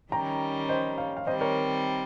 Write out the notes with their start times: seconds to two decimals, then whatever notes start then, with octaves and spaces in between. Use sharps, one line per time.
0.12 D#3 G3 C#4 G5 A#5
0.69 C5 D#5
0.98 C#5 F5
1.17 F5
1.26 D#3 G3 C4 C5 D#5
1.41 A#4 C#5